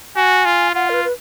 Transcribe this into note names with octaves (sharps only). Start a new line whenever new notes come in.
F#4 G#5
F4
F4 F#5
A#4
B4
B4